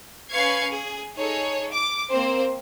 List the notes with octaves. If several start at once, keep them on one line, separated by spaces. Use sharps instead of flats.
C#4 B4 F5 C#6 G#6 C7
G#4
D#4 G#4 A4 C#5
D6
A#3 C4 C5